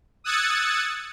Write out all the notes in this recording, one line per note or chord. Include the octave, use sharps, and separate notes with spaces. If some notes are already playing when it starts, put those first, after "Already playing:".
D#6 E6 F#6 G#6 A6 C#7